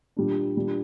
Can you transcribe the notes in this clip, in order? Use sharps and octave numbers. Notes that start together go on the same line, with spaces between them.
A#2 G3 D4
A#2 G3 D4